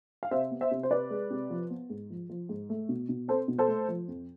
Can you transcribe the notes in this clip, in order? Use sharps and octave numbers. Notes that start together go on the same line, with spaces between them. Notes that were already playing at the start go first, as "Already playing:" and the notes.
F5
C3 C5 E5
B3
C5 E5
C3
C5
C3 B4 D5
G#3
C3
F3
B3
G#2
F3
F3
G#2
A3
B2
B2
C4 A4 C5
B2
A4 C5
A3
F3
F2